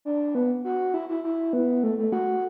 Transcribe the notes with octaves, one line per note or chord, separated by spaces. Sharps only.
D4
B3
F#4
E4
E4
E4
B3
A3
A3
F#4